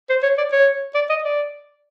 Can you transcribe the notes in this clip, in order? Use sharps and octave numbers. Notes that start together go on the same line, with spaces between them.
C5
C#5
D5
C#5
D5
D#5
D5